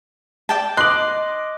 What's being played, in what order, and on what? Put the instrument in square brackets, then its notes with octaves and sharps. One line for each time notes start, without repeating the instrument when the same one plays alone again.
[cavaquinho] D5 G5 A5
[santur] D#5 D6 [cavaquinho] C6 [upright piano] F#6 F#7